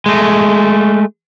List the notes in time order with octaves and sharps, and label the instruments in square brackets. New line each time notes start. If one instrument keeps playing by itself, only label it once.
[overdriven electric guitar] G#3 A3